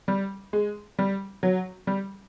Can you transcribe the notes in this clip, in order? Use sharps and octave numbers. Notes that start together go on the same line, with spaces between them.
G3
G#3
G3
F#3
G3